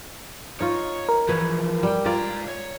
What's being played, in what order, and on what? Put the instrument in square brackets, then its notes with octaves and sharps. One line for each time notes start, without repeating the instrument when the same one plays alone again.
[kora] D#4 F4 [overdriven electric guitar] C#5
[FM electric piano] A#4
[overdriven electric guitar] E3 F3 [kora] G#4 B4 C#5
[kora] G3 G5
[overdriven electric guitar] G#2 A#5 [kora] F4 D5
[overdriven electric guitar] C#5